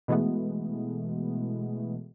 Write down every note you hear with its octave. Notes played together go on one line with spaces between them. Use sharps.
B2 E3 G#3 A3 B3